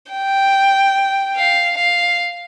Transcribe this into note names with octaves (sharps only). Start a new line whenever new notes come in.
G5
F5
F5